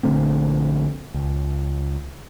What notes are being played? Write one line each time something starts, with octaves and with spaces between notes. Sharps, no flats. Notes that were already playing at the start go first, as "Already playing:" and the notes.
A#1 D3 A3 C4
C#2